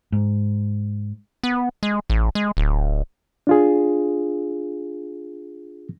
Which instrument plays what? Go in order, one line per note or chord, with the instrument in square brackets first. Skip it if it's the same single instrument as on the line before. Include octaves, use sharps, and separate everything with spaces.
[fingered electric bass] G#2
[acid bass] B3
G#3
A1
G#3
D1
[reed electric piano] D4 F4 G#4